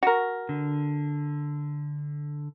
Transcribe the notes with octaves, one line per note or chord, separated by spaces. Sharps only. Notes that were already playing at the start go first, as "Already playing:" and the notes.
F#4 A#4
D3